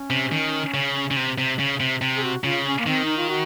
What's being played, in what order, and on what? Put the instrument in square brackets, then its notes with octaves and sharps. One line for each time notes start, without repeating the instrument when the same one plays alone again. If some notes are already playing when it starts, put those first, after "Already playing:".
Already playing: [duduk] C#4
[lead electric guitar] C3
D#3
C#3
C#3
C3
C3
C#3
C3
C3
[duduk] G#4
F#4
[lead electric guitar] C#3 [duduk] F4
[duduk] C#4
A#3
[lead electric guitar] D#3 [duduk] C4
[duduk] D#4
F4
F#4